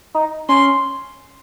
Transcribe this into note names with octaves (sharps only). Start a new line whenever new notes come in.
D#4
C#4 C6